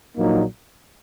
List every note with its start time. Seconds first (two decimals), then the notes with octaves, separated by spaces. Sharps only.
0.16 A#1 A#2 F#3 A#3 D#4